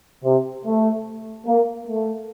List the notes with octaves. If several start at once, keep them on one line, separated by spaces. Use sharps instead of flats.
C3
A3
A#3
A3